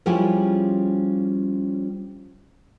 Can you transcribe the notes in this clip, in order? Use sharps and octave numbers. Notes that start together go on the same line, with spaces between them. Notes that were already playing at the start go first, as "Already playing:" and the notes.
F3 G3 C#4 E4 F4 G#4